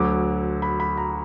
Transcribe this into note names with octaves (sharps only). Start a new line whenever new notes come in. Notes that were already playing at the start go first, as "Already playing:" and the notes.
Already playing: D2 D3 F#3 D6
B5
B5
A#5